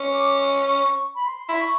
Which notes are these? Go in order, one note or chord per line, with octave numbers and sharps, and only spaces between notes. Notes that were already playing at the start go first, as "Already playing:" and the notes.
Already playing: C#4
D6
C#6
B5
C6
E4
C#6